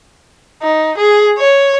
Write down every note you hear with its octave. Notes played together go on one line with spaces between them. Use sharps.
D#4
G#4
C#5